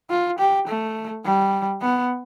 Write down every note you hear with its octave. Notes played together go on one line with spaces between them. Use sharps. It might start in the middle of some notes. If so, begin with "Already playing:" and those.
F4
G4
A3
G3
B3